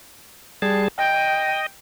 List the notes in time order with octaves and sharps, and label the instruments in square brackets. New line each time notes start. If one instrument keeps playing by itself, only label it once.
[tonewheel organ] G3 G#4 A5
[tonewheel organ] D#5 [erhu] G5